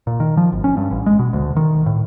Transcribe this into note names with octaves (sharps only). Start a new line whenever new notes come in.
A#2
D#3
F3
G#1
C#4
G2
A1
G#3
B2
D2
D#3
A2